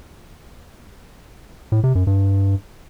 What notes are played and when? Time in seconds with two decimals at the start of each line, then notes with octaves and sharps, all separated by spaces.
1.72 A2
1.84 C3
1.95 F#2
2.07 G2